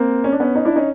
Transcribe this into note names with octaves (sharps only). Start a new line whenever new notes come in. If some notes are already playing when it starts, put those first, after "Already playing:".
Already playing: A#3 C4
C#4
D4
B3 C#4
C#4 D#4
D4 E4
C#4 D#4